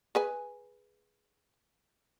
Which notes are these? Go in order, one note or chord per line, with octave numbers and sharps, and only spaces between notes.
G#4 B4 G#5